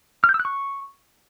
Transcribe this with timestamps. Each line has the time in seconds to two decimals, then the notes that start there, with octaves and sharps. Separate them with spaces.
0.24 F6
0.29 G6
0.34 E6
0.40 F#6
0.45 C#6